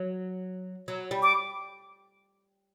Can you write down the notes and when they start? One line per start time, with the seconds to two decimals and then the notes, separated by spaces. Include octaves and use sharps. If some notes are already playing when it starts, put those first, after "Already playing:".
Already playing: F#3
0.88 F#3
1.11 G3
1.23 D6